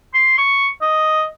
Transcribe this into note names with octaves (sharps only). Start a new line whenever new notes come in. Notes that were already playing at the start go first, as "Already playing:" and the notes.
C6
C#6
D#5